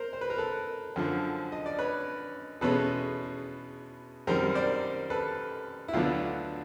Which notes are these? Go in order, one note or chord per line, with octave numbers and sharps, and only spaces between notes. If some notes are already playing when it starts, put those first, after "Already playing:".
Already playing: A#4 C5
C5
B4
A#4
A4 B4
F#2 D3 F3
D#5
D5
B4 C#5
E2 B2 G#3 C#4 A4 B4
F#2 D#3 G3 C4 A#4 C5
C5 D5
A4 B4
E4
D2 D3 F#3 B3 D4 F4